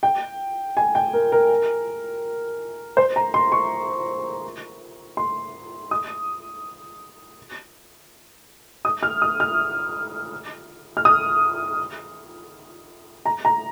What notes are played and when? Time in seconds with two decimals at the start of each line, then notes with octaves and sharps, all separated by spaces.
0.03 G5
0.77 G#5
0.95 G5
1.13 A#4
1.32 A#4
2.97 C5
3.16 A#5
3.34 C6
3.52 C#6
5.17 C6
5.91 D#6
8.85 D#6
9.03 F6
9.22 D#6
9.40 F6
10.97 F6
11.05 D#6
13.25 A#5
13.45 A#5